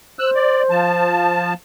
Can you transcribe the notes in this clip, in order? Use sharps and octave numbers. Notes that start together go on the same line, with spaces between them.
C5 E6 F#6
D5
F3 A5